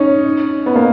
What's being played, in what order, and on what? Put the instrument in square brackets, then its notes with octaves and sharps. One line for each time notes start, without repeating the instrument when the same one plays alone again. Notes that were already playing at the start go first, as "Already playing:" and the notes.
Already playing: [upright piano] C#4 D#4
B3
A#3